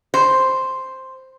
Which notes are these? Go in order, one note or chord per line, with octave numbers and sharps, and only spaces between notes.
C5